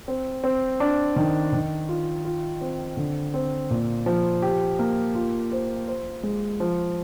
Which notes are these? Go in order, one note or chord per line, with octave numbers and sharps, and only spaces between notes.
C4
C4
D4
D#3
D#3
F4
F4
C4
D3
C4
A#2
F3
G4
A#3
F4
C5
C5
G#3
F3